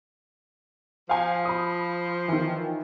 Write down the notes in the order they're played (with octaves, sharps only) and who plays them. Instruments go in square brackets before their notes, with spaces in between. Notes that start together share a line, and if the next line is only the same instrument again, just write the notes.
[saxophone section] F3 [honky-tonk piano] F5 G#5
[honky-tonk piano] B5 D#6
D#3 E3